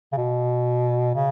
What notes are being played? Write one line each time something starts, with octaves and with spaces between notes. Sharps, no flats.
C#3
B2
C#3